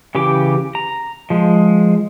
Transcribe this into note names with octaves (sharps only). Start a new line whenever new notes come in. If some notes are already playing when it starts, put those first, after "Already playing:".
C#3 E3 G4 D6
A#5
F3 G#3